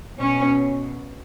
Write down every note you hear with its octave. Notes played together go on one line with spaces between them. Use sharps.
B2 C#4